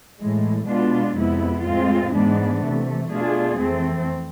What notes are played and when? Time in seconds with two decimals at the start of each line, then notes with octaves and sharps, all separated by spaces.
0.18 A2 E3 G#3
0.66 B2 G#3 B3 D4 F4
1.15 F2 C3 G#3 B3 E4
1.63 A2 G#3 C4 F4
2.12 G#2 E3 G#3 B3 D4
2.60 C3 E3 A3
3.09 B2 A3 D4 F4 G#4
3.57 F2 E3 A3 C4